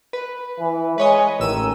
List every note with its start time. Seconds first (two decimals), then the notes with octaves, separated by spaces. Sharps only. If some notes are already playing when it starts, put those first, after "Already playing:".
0.13 B4
0.59 E3
0.98 G#3 B4 C#5 D#5
1.40 A1 D#3 E6 D#7